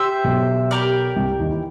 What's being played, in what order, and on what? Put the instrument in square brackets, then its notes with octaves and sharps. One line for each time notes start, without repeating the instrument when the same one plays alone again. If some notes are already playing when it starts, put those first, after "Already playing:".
Already playing: [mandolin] G4 C5 E5
[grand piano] B1 B2
[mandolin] G4 A#4 D5
[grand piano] C2 C3
D#2 D#3
E3